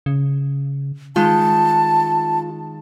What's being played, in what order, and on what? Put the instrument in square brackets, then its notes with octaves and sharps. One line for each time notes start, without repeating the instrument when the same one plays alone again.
[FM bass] C#3
[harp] D#3 G#3 [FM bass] F4 [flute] A5